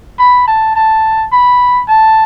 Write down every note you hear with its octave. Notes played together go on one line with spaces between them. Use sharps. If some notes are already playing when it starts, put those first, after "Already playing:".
B5
A5
A5
B5
A5